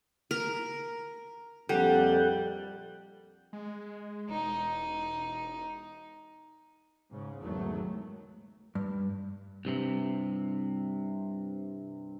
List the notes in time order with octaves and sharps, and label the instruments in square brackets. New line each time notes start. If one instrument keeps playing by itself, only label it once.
[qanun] A#4
[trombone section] A#1 F2 [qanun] G3 [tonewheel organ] A4 F#5 G5
[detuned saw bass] G#3
[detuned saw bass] E1 [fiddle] D#4
[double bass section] G#2 C#3
G#1 E2 D#3 F#3 A3
[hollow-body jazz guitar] G2
[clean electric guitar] C2 G2 C3